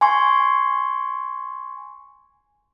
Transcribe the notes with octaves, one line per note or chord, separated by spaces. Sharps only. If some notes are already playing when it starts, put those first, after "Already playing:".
G#5 C6 C#6